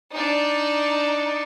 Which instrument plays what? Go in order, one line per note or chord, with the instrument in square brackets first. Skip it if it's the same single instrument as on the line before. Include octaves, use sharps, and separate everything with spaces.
[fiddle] D4 D#4